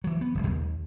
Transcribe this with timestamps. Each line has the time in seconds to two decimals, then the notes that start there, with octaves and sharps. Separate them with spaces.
0.04 E3 F#3
0.21 B3
0.35 F#1 B1 G#3
0.47 D#2